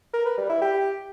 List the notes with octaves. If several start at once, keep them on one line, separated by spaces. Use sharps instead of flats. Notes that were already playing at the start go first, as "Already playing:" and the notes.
A#4
B4
G3
E4
G4